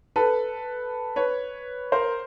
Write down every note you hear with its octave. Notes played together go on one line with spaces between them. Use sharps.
A4 B4
B4 C#5
A#4 C5